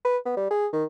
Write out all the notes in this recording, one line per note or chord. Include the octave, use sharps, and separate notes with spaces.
B4
B3
G3
G#4
D#3